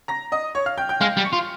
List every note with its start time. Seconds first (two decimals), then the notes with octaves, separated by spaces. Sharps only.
0.08 A#5 A#6
0.32 D#5 D#6
0.55 C#5 C#6
0.66 F5 F6
0.78 G5 G6
0.89 G5 G6
1.01 G#3 F5 F6
1.17 G3
1.25 C#6 C#7
1.33 F4